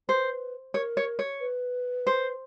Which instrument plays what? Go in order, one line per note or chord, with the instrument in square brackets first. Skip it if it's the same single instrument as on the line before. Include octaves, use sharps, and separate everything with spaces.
[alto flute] B4 [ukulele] C5
[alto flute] A#4 [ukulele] C#5
[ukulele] C#5
C#5
[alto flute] B4
[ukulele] C5